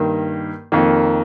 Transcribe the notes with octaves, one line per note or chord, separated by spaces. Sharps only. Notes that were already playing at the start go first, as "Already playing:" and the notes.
Already playing: G2 D#3 A#3
F2 D#3 A#3